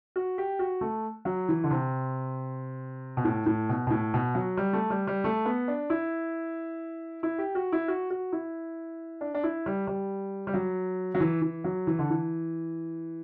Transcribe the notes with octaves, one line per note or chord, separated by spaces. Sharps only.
F#4
G4
F#4
A3
F#3
E3
D3
C3
B2
A2
A2
B2
B2
A2
B2
F#3
G3
A3
G3
G3
A3
B3
D4
E4
E4
G4
F#4
E4
F#4
F#4
E4
D4
D4
E4
G3
G3
G3
F#3
F#3
E3
E3
F#3
E3
D3
E3